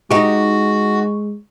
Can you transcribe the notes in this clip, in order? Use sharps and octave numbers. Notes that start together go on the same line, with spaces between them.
G#3 D#4 F#4 G4 C#6